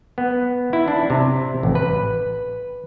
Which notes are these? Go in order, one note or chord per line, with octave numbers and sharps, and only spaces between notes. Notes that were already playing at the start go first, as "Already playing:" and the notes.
B3
E4
D4
C3
A1
B4